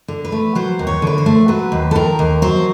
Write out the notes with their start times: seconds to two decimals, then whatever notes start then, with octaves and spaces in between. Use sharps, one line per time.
0.08 D3
0.25 B4
0.32 A3
0.55 F#3 C5
0.79 D#2
0.87 C#5
1.02 D3 B4
1.18 C5
1.26 A3
1.48 F#3 B4
1.72 D#2
1.91 A4
1.95 D#3 A#4
2.19 D#2
2.42 F#3 C5